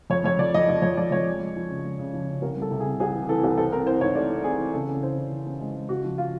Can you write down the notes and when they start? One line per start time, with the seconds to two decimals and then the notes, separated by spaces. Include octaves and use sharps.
0.10 F2 C#5
0.24 F2 C#5
0.39 F2 D5
0.54 F2 D#5
0.68 F3 D5
0.82 F2 C#5
0.97 F2 D5
1.11 F2 C#5
1.26 G#3
1.40 G#3
1.56 F3
1.70 C#3
1.84 G#3
1.99 C#3
2.14 F3
2.28 C#3
2.42 C2 A#4
2.57 G3
2.62 A4
2.71 C3
2.80 G#4
2.85 C3
3.00 C2 G#4
3.14 E3
3.29 E3 A4
3.44 C2
3.57 C4 A4
3.72 C4 A#4
3.86 E3 C5
4.01 G#2 C#5
4.15 A3 D5
4.30 C4
4.44 C4 G#4
4.59 E3
4.73 C#3 A4
4.88 C#4
5.03 E3 C5
5.17 E3
5.31 E3
5.47 C#4
5.60 G#3
5.75 G#3
5.89 C#3 F#4
6.04 F3
6.18 F4